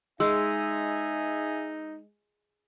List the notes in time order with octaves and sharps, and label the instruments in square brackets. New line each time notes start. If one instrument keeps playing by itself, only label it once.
[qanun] G#3 [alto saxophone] D#4 [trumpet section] G#4 E5 [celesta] E6